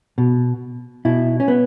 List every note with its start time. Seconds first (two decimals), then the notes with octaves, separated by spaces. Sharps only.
0.18 B2
1.05 B2 E4
1.40 C#4
1.48 B3